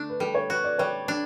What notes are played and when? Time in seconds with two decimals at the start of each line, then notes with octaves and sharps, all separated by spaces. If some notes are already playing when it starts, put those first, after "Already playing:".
Already playing: D3 A3 D4
0.10 B4
0.20 G3 A4
0.35 C#5
0.50 F#4 B4
0.64 D5
0.79 G3 C#5
1.08 D4